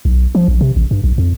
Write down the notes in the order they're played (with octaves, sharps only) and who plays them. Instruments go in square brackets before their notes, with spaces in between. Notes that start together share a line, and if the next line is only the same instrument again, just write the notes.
[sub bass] B1
F3
A#1
C3
A1
G2
B1
F2